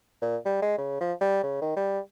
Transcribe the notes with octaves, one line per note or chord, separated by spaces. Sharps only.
A#2
G3
G#3
C#3
F3
G3
C#3
D#3
G3